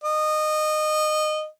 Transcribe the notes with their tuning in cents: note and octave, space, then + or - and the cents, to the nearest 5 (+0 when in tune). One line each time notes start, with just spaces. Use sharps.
D#5 -20